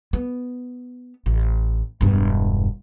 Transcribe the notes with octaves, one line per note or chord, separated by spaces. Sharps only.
B3
A1
E1 G2